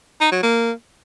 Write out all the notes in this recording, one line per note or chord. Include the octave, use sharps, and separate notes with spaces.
D#4
F#3
A#3